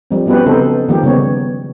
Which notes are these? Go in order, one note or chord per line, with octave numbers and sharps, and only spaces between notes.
F3 G3 C4
F3 F#3 B3 C#4 G4 B4
C#3 B3 C4 D#4 A4 C5
D#3 F3 G3 A#3 G4
C#3 G3 B3 C#5